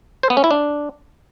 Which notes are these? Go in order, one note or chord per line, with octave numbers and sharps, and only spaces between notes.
C5
B3
C#4
E4
D4